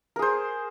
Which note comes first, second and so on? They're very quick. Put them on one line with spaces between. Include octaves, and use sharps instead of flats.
A#4 G#4 C5